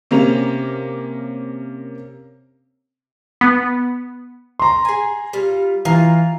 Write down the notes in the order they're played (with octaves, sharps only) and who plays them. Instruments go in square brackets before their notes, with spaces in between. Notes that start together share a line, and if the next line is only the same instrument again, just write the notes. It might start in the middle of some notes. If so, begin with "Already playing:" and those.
[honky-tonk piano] C3 A#3 C#4 F7
[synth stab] B3
[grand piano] A#5 C6
[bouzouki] G#4 G#5
G3 F4
[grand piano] E3 A#5 [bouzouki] F4